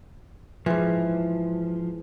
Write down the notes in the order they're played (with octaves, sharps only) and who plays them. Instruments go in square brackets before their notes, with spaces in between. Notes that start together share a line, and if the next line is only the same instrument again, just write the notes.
[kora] G#2 E3 [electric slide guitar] F3